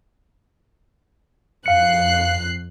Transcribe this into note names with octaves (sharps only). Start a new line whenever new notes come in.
F2 F5 F#6 C7 C#7